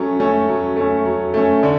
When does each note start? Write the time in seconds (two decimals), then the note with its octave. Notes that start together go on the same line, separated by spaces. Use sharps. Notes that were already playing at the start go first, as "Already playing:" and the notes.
Already playing: F#3 A3 C#4
0.20 A3 C#4
0.48 F#3
0.76 A3 C#4
1.05 F#3
1.34 A3 C#4
1.63 D3